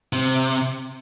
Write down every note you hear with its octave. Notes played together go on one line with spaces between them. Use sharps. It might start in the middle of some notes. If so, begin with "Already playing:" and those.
C3